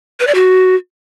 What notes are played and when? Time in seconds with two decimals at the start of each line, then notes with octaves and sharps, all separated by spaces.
0.20 B4
0.27 D5
0.35 F#4